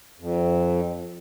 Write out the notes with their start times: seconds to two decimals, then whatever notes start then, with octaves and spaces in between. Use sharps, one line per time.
0.20 F2